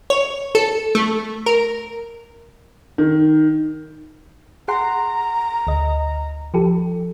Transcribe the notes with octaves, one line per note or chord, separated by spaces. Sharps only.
C#5
A4
A3
A#4
D#3
G#4 F#5 A#5 C6
D2 D#5
F3 G4 A4